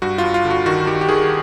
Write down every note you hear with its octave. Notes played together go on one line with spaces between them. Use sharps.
G2 F#4
F4
G2
F4
D3
F#4
D#3 F#4
D#3 G4
G4
D#3 G#4